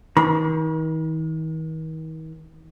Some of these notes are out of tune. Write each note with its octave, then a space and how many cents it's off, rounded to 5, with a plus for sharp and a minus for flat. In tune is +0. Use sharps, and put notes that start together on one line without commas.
D#3 +40 B5 -45